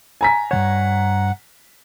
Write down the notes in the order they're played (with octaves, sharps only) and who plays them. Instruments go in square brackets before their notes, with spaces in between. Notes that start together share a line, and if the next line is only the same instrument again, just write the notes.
[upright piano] G#5 A#5 B6
[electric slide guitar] G2 D#3 C#5 [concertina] F#5